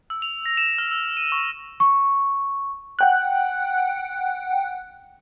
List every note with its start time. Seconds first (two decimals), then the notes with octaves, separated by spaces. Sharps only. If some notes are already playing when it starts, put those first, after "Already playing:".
0.10 E6
0.22 F7
0.46 A#6
0.57 E7
0.78 F6
0.91 E6
1.17 D#7
1.32 C#6
1.80 C#6
2.99 F#5 G5 F#6